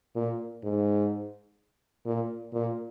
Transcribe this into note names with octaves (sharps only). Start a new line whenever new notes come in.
A#2
G#2
A#2
A#2